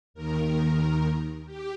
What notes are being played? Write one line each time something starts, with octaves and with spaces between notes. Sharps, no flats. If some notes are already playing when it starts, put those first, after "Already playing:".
D#2 D#3 A#4
G4